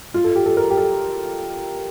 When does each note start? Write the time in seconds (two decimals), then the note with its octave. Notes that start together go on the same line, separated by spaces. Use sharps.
0.14 F4
0.24 A4
0.35 G4
0.46 A4
0.57 A#4
0.70 G4
0.77 A4